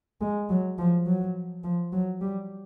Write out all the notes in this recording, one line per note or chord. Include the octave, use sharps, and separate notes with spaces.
G#3
F#3
F3
F#3
F3
F#3
G3